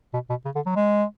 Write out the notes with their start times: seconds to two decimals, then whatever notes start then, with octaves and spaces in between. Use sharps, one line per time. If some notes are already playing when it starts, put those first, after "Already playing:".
0.13 B2
0.29 B2
0.45 C#3
0.55 D3
0.66 F#3
0.76 G#3